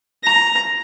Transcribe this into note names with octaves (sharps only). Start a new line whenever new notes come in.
A#5